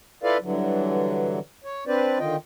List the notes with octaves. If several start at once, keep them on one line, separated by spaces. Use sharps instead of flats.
E4 F4 A4 B4 D5 F5
G2 D3 E3 F#3
C#5
C4 D4 B4 C5 D5
D3 D#3 F4 D#5 G5